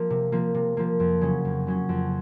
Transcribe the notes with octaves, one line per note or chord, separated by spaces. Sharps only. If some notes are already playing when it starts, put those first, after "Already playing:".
Already playing: F3 A#3
C3
F3 A#3
C3
F3 A#3
F2
C#3 F#3 C#4
F2
C#3 F#3 C#4
F2